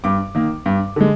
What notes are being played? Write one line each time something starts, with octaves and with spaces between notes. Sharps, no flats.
G2 D6
D#3 A#3
G2
D3 G#3